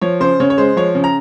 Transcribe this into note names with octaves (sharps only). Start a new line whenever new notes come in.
F3 C#5
C#3 C5
C#3 C#5
C#5
G#3 C5
F3 C#5
C#3
A#5